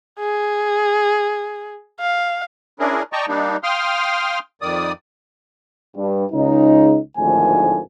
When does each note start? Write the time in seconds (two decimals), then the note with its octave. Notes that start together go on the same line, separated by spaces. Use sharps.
0.20 G#4
2.00 F5
2.79 C#4 D4 E4 G#4 A#4
3.13 D5 D#5 G5 A5 A#5 C#6
3.28 G3 A#3 D4 D#4
3.63 F5 G5 C6 D#6 F6
4.62 F2 D#3 D5 D#6
5.96 G2
6.32 C#2 C#3 G#3 D#4
7.17 G#1 D2 A2 D#3 F3 G#5